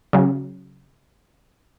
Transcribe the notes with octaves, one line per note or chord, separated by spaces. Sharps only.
C#3 F#3